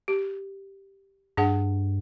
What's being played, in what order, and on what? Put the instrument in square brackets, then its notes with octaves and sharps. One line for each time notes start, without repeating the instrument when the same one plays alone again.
[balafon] G4
[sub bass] G2 [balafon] D4 G#4 F#5